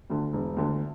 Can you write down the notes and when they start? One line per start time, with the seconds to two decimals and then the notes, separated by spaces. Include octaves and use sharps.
0.10 D2 D3
0.33 E1
0.56 D2 D3